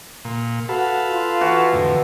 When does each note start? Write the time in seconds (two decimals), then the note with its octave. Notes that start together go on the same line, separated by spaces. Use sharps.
0.25 A#2
0.69 F#4 A4 B4 F5
1.11 F4
1.41 E3 F#4
1.73 F2 A2 D3